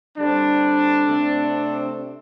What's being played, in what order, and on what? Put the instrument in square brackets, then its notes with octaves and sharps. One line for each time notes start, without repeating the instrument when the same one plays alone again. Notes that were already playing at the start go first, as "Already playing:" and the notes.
[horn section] D3 G3 C4 D4
C3 A3 C4